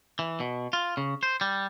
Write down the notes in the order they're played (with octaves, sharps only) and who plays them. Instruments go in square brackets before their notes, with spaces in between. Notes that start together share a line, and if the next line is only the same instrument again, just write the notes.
[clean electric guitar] E3
B2
F4
C#3
C5
G3